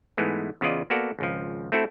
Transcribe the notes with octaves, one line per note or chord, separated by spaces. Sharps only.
G#2 E3 G#3 A3 B3
E2 C#3 E3 F4 D5 D#5
A#3 B3 F#4 A4 D5 A#5
G#1 C#2 F3
A3 C4 E4 F#4 A4